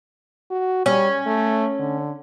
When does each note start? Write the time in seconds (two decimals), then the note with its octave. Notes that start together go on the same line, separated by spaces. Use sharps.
0.50 F#4
0.86 G3 C#4
1.26 A3
1.79 D3